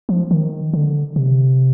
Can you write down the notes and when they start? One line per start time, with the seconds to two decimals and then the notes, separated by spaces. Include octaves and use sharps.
0.09 F3
0.31 D#3
0.73 D3
1.16 C3